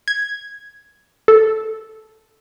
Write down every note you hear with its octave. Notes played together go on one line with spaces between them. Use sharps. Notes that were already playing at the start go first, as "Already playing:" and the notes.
G#6
A4